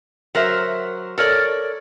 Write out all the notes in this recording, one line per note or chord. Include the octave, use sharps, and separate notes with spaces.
F#3 A#4 C5 E5
A4 A#4 C#5 D5